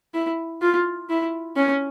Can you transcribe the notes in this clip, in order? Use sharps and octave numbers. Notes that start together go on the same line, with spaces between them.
E4
F4
E4
C#4